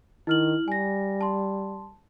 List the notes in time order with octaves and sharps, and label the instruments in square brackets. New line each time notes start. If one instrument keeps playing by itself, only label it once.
[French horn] D#3 [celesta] E4 F6 F#7
[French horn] G3 [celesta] G#5 A#6
[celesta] A5 C6